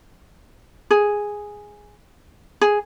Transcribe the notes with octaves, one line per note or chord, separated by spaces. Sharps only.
G#4
G#4